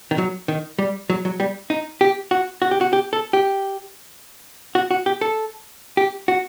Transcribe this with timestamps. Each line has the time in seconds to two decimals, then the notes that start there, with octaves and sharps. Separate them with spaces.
0.11 D#3
0.18 F#3
0.48 D#3
0.79 G3
1.10 F#3
1.25 F#3
1.40 G3
1.70 D#4
2.01 G4
2.31 F#4
2.62 F#4
2.71 G4
2.81 F#4
2.93 G4
3.13 A4
3.33 G4
4.75 F#4
4.91 F#4
5.06 G4
5.21 A4
5.97 G4
6.28 F#4